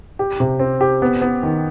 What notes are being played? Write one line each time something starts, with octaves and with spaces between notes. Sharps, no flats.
G4
C3
C4
G4
B3
B3
D#3